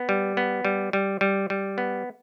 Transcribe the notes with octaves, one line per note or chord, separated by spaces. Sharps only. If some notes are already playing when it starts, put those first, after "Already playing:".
Already playing: B3
G3
B3
G3
G3
G3
G3
B3